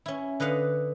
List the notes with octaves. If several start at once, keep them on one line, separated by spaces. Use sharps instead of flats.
C#4 E4
D3 B4 D#5 F5 F#5